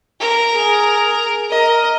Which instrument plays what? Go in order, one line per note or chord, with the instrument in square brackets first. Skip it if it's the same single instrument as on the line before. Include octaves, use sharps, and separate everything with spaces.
[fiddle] A#4
[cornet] G#4
[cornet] A#4 [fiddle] D#5